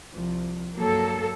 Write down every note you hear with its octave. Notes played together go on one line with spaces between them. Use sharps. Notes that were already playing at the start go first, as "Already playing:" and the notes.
C2 F3
G2 F#3 A#3 A4